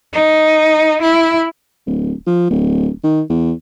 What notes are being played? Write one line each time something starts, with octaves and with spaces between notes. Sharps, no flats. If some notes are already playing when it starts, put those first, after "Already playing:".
D#4
E4
D1
F3
D1
D#3
E2